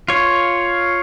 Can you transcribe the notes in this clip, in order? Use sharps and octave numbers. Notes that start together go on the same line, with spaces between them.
F4 C#5